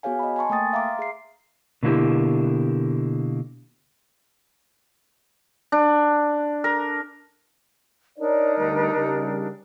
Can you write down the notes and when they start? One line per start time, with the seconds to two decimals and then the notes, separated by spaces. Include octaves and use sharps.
0.03 B3 F#4 G#4 C#5 F5 G#5
0.19 D#5 B5
0.36 G#5 A5 C6 C#6
0.50 A3 A#3 G5 D#6 A6
0.73 E5 F5 A#5 C6 D6
0.99 G#4 E5 C7
1.83 B2 D3 A#3 B3 E4 G4
5.72 D4
6.64 A#4
8.19 D4 D#4 A#4 C#5 D5
8.58 D2 G3
8.95 C#3 G3